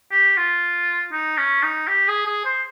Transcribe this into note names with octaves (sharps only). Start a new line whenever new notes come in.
G4
F4
D#4
C#4
D#4
G4
G#4
G#4
C5